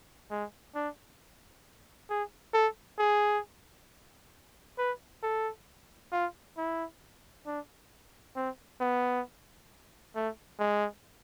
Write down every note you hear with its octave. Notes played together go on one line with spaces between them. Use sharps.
G#3
D4
G#4
A4
G#4
B4
A4
F4
E4
D4
C4
B3
A3
G#3